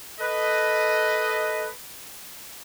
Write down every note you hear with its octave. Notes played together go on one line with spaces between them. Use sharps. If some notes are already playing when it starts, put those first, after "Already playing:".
A4 B4 D#5